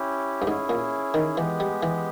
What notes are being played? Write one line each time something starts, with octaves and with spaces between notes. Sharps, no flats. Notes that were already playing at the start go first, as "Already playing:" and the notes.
Already playing: C#4 E4 G4
G2
G#2 C#4 E4 G#4
A#2
D#3
E3 G#3 B3 G4
G3
E3